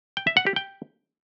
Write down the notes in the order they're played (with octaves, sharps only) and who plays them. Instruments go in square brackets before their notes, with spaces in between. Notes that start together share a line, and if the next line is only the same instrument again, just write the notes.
[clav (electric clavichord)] G5
E5
F#5
G4
G5